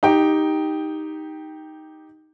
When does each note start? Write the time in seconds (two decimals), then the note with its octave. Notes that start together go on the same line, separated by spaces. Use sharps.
0.03 D#4 G4 G5